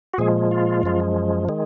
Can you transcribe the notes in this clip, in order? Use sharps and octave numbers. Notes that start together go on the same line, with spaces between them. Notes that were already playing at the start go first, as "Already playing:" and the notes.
F#4
A#2 F3 G#3 G#4
F4
F#2 F3 G#3
D#3 G#3